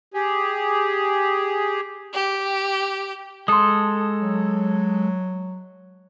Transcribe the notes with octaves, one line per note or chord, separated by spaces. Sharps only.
G4 G#4
G4
G#3 A4 C6 D#6
F#3